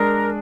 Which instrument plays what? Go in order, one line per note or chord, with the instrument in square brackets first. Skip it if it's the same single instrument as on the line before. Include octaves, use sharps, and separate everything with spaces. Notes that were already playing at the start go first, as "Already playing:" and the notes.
Already playing: [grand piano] G#3 D4 [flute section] A#4